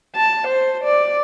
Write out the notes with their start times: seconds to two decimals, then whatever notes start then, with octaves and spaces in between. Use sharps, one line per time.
0.16 A5
0.47 C5
0.84 D5